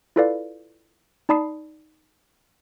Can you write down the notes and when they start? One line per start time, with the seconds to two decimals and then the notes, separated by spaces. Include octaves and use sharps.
0.16 E4 F4 A4 B4 D5 F5
1.29 D#4 D5 A5 B5 D#6 C7